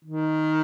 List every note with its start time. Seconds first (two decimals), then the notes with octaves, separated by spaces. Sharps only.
0.05 D#3